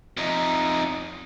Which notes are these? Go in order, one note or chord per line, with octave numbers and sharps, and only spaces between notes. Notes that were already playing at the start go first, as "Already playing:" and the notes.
F2 D#4